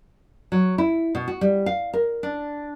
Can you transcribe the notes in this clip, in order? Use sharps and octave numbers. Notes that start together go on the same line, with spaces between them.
F#3
E4
B2
F#4
G3
F5
A#4
D4